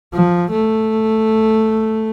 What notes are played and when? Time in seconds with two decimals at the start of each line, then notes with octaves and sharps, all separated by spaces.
0.13 F3
0.51 A3